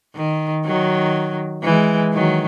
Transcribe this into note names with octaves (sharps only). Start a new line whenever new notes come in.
D#3
D#3 F#3
E3 G#3
D#3 F#3